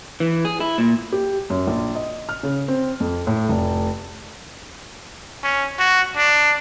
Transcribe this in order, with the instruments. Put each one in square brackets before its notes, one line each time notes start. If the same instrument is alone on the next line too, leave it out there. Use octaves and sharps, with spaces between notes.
[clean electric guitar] E3
G#4
E4
A#2
[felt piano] G4
F#2
A#1
D#5
F6
C#3
C4
F2
A2
F1
[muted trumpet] C#4
F#4
D4